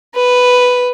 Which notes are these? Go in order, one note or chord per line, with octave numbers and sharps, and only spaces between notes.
B4